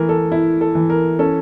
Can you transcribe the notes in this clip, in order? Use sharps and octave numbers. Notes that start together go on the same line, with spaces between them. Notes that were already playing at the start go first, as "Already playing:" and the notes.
Already playing: E3 A3 A#4
A4
E4
A4
E3
A#4
C#4 A4